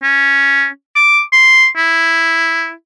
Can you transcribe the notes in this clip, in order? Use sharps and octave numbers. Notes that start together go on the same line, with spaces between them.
C#4
D6
C6
E4